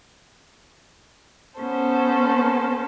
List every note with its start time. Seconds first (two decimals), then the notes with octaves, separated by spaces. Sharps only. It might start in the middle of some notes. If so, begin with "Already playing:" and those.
1.58 B3 C#4 A4 C5